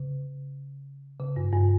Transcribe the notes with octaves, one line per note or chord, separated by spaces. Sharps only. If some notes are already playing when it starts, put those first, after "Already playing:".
Already playing: C#3
C#3
G2
G2